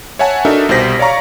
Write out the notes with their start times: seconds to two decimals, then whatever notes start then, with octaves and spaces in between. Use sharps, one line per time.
0.19 C#5 E5 F#5 G#5 A5
0.45 D4 D#4 F#4 A4 A#4 E5
0.69 C2 B2 G4 C5 A#6 B6
0.99 C#5 D5 F5 A#5 C#6